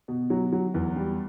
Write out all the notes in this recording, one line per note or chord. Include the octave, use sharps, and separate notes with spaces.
B2
F#3
F#3
E2
G3